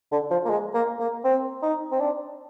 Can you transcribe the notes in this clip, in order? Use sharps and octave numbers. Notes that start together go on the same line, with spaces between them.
D3
F3
A#3
G#3
A#3
A#3
C4
D#4
C4
D4